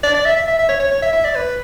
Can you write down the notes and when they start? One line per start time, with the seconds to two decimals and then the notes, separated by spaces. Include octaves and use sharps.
0.03 D5
0.14 D5
0.25 E5
0.36 E5
0.47 E5
0.59 E5
0.69 C#5
0.80 C#5
0.91 C#5
1.02 E5
1.13 E5
1.25 D5
1.35 B4